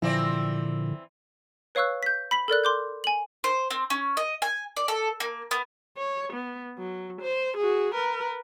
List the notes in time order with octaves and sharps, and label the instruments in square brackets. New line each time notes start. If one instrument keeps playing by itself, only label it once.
[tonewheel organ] A#2 [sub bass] D3 [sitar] E3 C4 D5 [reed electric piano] F3 E4 F4
[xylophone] B4 C#5 F5 C#6 E6 F#6
G6 B6
B5 B6 F#7
A4 A#4 D5 F#6
C6 D6 G6
G#5 F#7
[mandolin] C5
C4
C#4
D#5
G#5
D5
A4
A#3
B3
[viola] C#5
B3
F#3
C5
F#4 G#4
A#4 B4